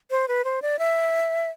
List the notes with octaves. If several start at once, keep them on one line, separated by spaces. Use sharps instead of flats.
C5
B4
C5
D5
E5